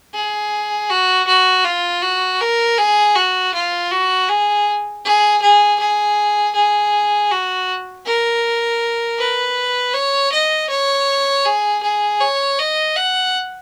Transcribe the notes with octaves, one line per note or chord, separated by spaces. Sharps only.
G#4
F#4
F#4
F4
F#4
A#4
G#4
F#4
F4
F#4
G#4
G#4
G#4
G#4
G#4
F#4
A#4
B4
C#5
D#5
C#5
G#4
G#4
C#5
D#5
F#5